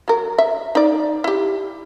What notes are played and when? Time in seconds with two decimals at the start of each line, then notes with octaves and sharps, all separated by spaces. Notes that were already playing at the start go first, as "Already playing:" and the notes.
0.08 F#3 A#4
0.38 E5
0.75 D#4 D5
1.24 E4 G4